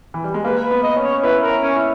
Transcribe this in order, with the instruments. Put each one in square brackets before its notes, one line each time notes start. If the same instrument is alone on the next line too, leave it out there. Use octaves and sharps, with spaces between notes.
[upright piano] E3
G3
G#3
[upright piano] A#3 [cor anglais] B4
[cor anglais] B4
[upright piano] B3
[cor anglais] D#5
[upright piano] C#4
[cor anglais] C#5
[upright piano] E4 [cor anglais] B4
[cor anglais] A#4
[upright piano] C#4
[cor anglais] C#4
[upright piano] E4